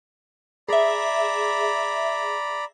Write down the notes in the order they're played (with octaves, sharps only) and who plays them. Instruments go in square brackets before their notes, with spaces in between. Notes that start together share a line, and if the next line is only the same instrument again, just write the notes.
[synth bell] G#4 E5 [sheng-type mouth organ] D5 A#5 B5